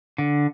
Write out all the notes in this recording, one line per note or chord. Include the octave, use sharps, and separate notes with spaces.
D3